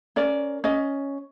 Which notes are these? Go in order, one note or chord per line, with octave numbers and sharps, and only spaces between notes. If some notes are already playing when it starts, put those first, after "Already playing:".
C#4 A#4 D5
C#4 D#5